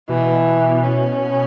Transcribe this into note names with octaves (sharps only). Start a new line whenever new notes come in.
B2 E3
C#4